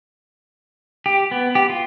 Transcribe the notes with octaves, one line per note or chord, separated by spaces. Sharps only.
G4
B3
G4
F4